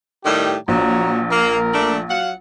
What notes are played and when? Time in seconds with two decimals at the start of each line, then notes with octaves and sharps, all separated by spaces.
0.24 A2 D#3 G3 G4
0.68 A#1 F#3 A#5
1.31 A#3 A#4
1.73 A3 D4
2.09 F#3 F5 F#5